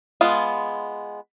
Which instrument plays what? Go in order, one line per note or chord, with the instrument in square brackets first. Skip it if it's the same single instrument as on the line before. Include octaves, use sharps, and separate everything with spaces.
[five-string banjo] G#3 B3 F4